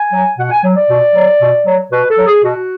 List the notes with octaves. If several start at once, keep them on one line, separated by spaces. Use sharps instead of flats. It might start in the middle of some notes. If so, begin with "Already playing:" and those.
Already playing: G#5
F#3
B2 F#5
G#5
F#3
D5
B2
F#3
B2
F#3
B2 B4
A4
F#3
G#4
B2 F#4